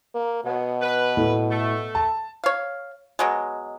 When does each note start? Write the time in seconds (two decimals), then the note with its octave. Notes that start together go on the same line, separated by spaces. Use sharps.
0.15 A#3
0.44 B2 F#3 B3
0.82 B4
1.17 A2
1.51 A3
1.95 A5
2.44 C#5 F5
3.19 B2 F#3 G#3